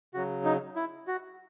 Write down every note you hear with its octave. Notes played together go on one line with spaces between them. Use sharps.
C#3 F#3 F#4
D#4
E4
F#4